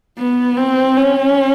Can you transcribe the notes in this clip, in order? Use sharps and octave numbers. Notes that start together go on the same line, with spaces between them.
B3
C4
C#4